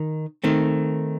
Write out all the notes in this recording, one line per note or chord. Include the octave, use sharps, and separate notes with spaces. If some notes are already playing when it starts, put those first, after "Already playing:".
Already playing: D#3
D#3 A3 C4